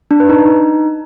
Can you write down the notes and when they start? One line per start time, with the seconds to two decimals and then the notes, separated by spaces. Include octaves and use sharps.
0.11 D4
0.20 B4
0.29 D#4